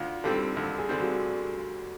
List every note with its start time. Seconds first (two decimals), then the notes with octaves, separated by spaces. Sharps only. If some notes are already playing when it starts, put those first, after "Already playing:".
Already playing: D2 F4
0.24 D3 G3 C4 A4
0.57 D2 A4
0.78 G#4
0.89 D3 G3 C4
1.00 F#4